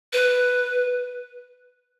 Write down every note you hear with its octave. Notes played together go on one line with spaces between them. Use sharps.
B4